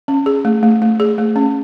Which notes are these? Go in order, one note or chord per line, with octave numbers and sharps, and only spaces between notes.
C#4
G#4
A3
A3
A3
G#4
A3
C#4